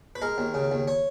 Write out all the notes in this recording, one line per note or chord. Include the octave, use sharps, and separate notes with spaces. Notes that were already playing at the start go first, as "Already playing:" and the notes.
B4
G#3 A#4
D#2
C#3
D#2
C#5